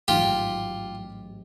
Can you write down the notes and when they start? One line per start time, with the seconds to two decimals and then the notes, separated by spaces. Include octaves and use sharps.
0.08 A1 G#2 D#3 F#3 F4 G4